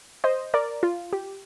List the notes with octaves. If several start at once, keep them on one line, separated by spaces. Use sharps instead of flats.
C5 D#5
A#4 D5
F4
G4